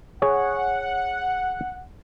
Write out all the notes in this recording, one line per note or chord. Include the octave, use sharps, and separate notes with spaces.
G#4 C#5 F#5